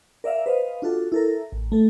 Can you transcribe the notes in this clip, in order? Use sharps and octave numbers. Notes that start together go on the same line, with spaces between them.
A#4 D5 E5 F5
B4 C5 D#5 F5
D4 F4 F#4 A4
E4 A4 A#4
A1
A3 A4